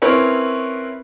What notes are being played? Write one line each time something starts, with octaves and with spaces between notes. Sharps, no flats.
C4 C#4 E4 A#4 B4 C#5